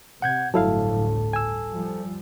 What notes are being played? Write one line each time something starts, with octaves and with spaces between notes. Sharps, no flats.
C3 F#5 G6 G#6
G1 D2 A2 F#3 E4 A4 F5 A5
G#5 E6
F3 G3